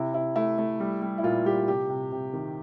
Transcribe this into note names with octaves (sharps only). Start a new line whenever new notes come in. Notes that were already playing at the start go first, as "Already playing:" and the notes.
Already playing: C3 E4
C3 E4
A3 E4
A3
G3
G3
E4
A#2 F4
G3 G4
C3 G4
C3
C3
D#3